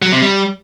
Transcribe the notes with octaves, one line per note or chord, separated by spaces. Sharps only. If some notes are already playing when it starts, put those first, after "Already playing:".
F#3
C3
G3